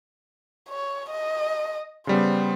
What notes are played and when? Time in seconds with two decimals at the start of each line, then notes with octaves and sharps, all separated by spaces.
0.69 C#5
1.11 D#5
2.07 C#3 G3 B3 C5